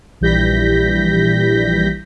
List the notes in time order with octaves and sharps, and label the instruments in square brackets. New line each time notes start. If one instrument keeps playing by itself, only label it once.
[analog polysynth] A#1 E3 G3 G6 A#6 B6